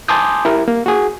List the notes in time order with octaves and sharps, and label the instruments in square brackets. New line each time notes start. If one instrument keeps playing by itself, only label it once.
[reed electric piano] G#5 A5 C6 D6 D#6 G6
E4 G4 A#4
A#3
F#4 G#4